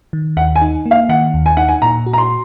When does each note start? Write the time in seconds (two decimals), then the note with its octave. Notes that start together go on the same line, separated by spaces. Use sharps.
0.13 D#3
0.37 D#2 F#5
0.56 G#5
0.62 D#4
0.86 A#3
0.91 F5
1.09 D#3 F#5
1.34 D#2
1.46 G#5
1.57 D#4 F#5
1.68 G#5
1.82 A#2 A#5
2.06 F#4
2.13 A#5
2.18 C6